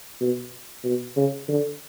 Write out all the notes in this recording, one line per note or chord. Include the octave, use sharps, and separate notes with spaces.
B2
B2
C#3
D3